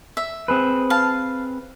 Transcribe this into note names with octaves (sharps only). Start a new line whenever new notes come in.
E5
C4 G#4 B4
F5 A5